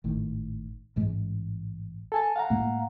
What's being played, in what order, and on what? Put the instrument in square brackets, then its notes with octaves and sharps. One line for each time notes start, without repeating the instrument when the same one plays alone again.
[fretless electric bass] G#1 A2 D#3
A1 G#2 G#3
[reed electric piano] A4 G#5 A5
F5 F#5 A#5
[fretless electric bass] A2 G#3 A#3